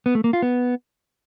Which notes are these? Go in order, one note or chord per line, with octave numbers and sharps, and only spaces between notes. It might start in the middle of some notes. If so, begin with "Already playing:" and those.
B3
A3
A#3
F4
B3